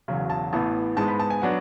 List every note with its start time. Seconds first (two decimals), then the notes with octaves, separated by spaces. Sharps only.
0.08 E1 E2 C#3 F#3
0.30 A5
0.53 A1 A2 E3 B3 A5
0.97 G#2 G#3 B3 A5
1.08 B5
1.20 A5
1.30 G#5
1.42 F#3 B3 D4 F#5